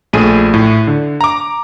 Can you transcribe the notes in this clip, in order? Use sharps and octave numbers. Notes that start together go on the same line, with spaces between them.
A#1 A3 G#4 D#7
A2
D3
A#5 D6